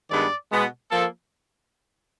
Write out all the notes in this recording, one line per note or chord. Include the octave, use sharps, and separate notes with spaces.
G2 D#3 G#3 B3 D5
B2 G#3 B3
F3 A#3 A4